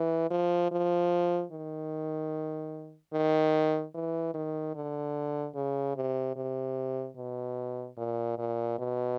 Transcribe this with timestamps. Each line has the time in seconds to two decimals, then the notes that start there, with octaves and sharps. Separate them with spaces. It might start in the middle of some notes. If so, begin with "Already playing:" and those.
Already playing: E3
0.30 F3
0.72 F3
1.52 D#3
3.13 D#3
3.95 E3
4.34 D#3
4.75 D3
5.55 C#3
5.96 C3
6.36 C3
7.16 B2
7.97 A#2
8.38 A#2
8.78 B2